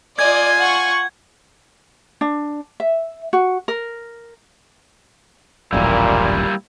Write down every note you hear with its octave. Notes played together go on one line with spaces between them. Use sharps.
F4 D5 D#5 G#5 G#6
F#5 C#6
D4
E5
F#4
A#4
D#1 A1 F#2 A#2 G3 A#3 E4